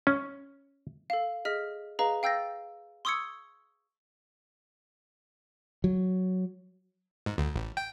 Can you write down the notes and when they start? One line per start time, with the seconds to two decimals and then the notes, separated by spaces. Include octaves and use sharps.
0.07 C#4
1.10 A4 F5
1.45 G#4 D#5 F6 B6
1.99 G#4 B4 D#5 F5 A#5
2.23 F5 G5 E6 G6 A6 A#6
3.05 C6 C#6 D#6 E6 G#6 C#7
5.84 F#3
7.26 G#2
7.38 D2
7.56 A1
7.77 G5